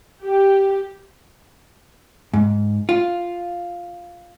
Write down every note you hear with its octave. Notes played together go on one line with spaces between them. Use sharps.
G4
G#2
F4